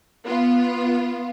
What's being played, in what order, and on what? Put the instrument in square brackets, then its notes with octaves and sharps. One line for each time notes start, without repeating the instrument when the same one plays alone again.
[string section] B3 F4